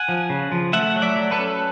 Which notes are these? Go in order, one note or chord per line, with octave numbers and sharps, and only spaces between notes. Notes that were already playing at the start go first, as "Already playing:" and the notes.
Already playing: F#5 G#5
F3
C#3
F3
A3 E5 F#5
F#3
D5 E5
F#3
A4 B4
C#4